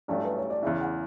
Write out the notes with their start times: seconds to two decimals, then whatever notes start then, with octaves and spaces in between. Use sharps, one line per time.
0.08 A1 G2 F#3 A3 D5
0.25 B4
0.37 C#5
0.50 D5
0.63 E2 C#3 E3 E5
0.81 F#5